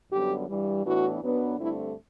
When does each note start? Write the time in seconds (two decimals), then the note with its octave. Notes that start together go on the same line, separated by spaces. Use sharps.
0.11 F#2 D3 G3 B3 G4
0.48 G2 E3 G3
0.84 A2 E3 B3 D4 F#4
1.21 F#2 F#3 B3 D4
1.57 G2 D3 A3 C4 E4